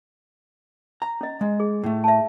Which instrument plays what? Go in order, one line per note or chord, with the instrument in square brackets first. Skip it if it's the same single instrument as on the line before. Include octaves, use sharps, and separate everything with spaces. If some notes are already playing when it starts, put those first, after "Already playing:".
[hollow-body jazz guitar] A#5
[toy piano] C#4 D#5
[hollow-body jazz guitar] G#3
[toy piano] G#4
[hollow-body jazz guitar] A2 A3
[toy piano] E5 A5